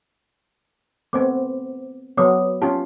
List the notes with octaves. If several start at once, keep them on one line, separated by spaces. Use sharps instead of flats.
A3 B3 C4 C5 D6
F#3 B3 C#5 D6 D#6
C#4 F4 G4 A5